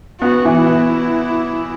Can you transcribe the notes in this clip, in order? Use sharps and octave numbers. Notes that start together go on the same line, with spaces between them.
B3 F#4
E3
E4
B3